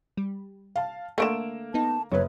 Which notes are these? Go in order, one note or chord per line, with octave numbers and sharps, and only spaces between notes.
G3
F5 A5
D3 D#3 A3 A#3 D7 E7
B3 D#4 A5
F#1 F#3 B3 B4 C#5